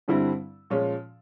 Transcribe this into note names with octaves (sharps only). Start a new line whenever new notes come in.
G2 D3 G3 C4 E4
A#2 F3 G#3 C#4